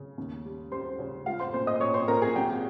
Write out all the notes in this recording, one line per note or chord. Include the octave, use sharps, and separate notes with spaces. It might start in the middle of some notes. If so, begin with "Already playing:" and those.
Already playing: C#3
D#2
G3
G3 C5 C6
C#3
G#3 F4 F5
C5 C6
A#2 C5 C6
D#5 D#6
A#2 C#5 C#6
C5 C6
A#2 A#4 A#5
G#4 G#5
G#1 G4 G5